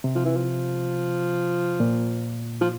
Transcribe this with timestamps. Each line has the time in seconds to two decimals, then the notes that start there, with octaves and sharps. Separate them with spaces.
0.04 C3
0.15 F3
0.25 E3
0.36 F3
1.80 A#2
2.61 F3